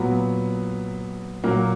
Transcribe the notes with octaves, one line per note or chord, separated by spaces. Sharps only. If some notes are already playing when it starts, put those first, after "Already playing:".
Already playing: A#2 F#3 B3
A#2 F#3 A#3